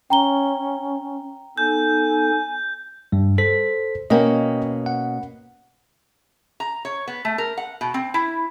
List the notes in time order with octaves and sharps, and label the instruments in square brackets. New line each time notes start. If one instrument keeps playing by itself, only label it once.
[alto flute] C#4 [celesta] G5 A#5 G7
[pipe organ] B3 D#4 A4 [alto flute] G#5 [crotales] G6
[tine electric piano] G2 G3
A4 C5 B6
[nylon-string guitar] B2 A#3 C#4 [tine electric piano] D#5 G5
[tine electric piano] F#5
[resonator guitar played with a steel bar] A#5
C#5
B3
A3
A#4
F#5
B2
C4
E4